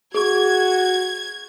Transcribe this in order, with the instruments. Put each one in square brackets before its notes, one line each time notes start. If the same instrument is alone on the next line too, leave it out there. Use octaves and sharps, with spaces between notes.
[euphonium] F#4 [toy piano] G#4 C#6 [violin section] G#6